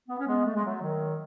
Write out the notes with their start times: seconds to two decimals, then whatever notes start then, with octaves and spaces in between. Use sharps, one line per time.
0.08 B3
0.18 C#4
0.27 G#3 B3
0.46 A3
0.55 G#3
0.65 F#3 A3
0.81 D#3 F#3